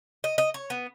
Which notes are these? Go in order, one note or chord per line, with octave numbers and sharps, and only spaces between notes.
D#5
D#5
C#5
B3